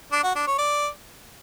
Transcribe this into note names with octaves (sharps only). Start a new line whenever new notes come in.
D4
F#4
D4
C#5
D5